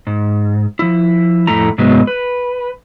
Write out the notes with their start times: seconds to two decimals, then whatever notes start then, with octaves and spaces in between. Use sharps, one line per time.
0.07 G#2
0.79 F3 E4
1.47 F2 A2 A3 E4 A#5
1.78 G#2 C3 F#3 G#3 B3
2.07 B4